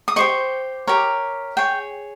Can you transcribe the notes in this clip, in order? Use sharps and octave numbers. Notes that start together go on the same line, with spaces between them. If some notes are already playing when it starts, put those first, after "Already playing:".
D#6
G4 C5 D#5 C#6
G4 A#4 C#5
G#4 C#5 G5